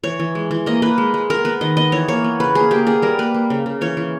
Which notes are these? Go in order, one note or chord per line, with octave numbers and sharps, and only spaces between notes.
E3 C#5
E3
G#3
E3
A#3 D#5
A#3 B4
G#3
G#3
B3 A#4
B3 B4
D#3 D#5
B3 D#5
E3 C#5
A#3 C#5
B3
C#3 B4
A#3 G#4
A#3 G4
B3 G#4
G3 A#4
A#3 B4
A#3
C#3
C#3
E3 C#5
E3